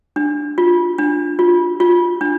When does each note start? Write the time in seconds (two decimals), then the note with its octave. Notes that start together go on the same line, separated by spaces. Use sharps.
0.16 D4
0.58 F4
0.98 D4
1.39 F4
1.80 F4
2.21 D4